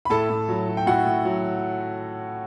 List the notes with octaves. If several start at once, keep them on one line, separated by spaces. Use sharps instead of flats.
B5
A2 A4 A5
A2
F#3
F#3
G5
A2 F#4 F#5
A2
F#3